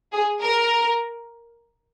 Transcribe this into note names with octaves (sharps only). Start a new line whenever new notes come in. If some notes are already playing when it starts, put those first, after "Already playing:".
G#4
A#4